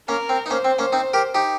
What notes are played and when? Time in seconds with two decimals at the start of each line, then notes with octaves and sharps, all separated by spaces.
0.08 A#3 C#4 A#4
0.29 C4
0.46 D#4
0.50 A#3 C#4 C5
0.65 C4
0.79 A#3 C#4
0.92 C4 D#4
1.13 G4 A#4
1.34 D#4 G4